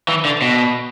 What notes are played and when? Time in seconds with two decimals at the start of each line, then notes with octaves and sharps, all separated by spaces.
0.08 E3
0.25 D3
0.42 B2